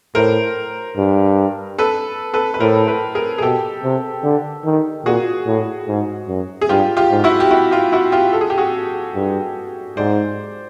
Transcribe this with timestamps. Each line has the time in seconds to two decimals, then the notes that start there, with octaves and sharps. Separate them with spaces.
0.15 A2 A#4 C5
0.97 G2
1.78 A4 B4
2.34 A4 B4
2.54 B4
2.60 A2 A#4 C5
2.87 A4 B4
3.15 G#4 A#4
3.38 G#4
3.42 B2 G4 A4
3.83 C3
4.24 D3
4.65 D#3
5.06 A#2 F#4 G#4
5.46 A2
5.88 G#2
6.28 F#2
6.62 G#4
6.69 G2 F4 G4
6.97 F4 G4
7.10 G#2
7.24 E4 F#4
7.40 G4
7.51 E4 F#4
7.71 F4 G4
7.92 E4 F#4
8.12 F4 G4
8.33 A4
8.41 G#4
8.50 G4
8.58 F#4 G#4
9.15 G2
9.97 G#2 C5 D5